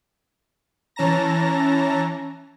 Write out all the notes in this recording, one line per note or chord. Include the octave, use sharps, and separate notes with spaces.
E3 C#4 A5 A#5 A#6